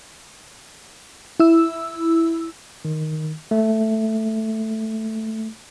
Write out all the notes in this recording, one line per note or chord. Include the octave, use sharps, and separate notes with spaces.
E4 E6
D#3
A3